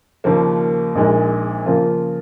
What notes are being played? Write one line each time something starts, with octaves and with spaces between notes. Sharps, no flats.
D#2 C#3 F3 A#3
A#1 A#2 G#3 D#4
C#3 F3 A#3 F4